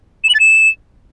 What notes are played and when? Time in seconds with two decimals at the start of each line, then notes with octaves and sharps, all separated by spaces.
0.24 E7
0.29 F#7
0.34 A6
0.40 E7